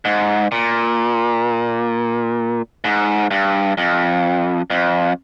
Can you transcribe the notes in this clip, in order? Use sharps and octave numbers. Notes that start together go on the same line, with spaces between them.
G#2
A#2
G#2
G2
F2
F2